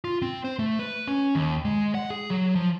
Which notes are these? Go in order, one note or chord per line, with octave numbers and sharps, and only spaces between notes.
F4
C4
C5
A3
B4
C#4
D#2
G#3
F#5
G#4
F#3
F3